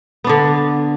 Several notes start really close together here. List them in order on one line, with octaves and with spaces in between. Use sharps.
B3 D4 D3